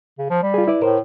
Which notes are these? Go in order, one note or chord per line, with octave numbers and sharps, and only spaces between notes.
C#3
F3
G3
F4 G#4
E4 B4 D5
A2 A#4 C5